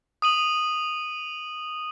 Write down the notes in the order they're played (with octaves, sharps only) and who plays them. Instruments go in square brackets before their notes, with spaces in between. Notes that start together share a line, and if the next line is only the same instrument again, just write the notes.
[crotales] D#6 D#7 F#7